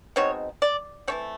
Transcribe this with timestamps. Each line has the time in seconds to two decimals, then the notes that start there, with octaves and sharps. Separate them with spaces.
0.16 B2 G#3 C4 D#4 C#5
0.62 D5
1.08 E3 A3 C4 C#5